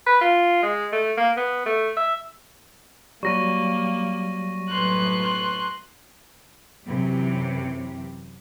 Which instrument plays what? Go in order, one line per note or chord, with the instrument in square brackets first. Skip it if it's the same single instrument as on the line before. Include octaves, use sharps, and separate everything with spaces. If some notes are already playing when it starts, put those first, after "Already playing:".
[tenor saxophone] B4
F4
G#3
A3
A#3
B3
A3
E5
[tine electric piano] F#3 G3 [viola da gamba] A#3 [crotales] C#6 A#6 D#7
[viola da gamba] F#2 A2 B4 [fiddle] C6 F#6
[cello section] F#2 C3 E3 G4